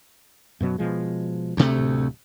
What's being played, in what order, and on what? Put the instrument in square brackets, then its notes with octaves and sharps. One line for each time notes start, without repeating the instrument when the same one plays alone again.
[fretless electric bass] F#2 B2 F#3
B2 F3 G#3
[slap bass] D2 C3 A3
[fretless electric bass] D1